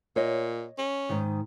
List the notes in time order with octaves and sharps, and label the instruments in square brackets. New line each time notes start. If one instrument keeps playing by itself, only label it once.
[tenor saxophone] A#2 [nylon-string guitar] C#5 D#5
[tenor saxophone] C#4
[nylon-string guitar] G#2 D#3